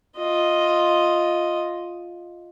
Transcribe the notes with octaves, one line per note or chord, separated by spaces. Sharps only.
F4 D#5